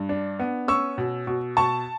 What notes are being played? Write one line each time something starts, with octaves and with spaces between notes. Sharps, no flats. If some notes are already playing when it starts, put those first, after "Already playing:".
Already playing: G2
D4
B3
C#4 C#6 E6
B2
B2
B2 A5 C#6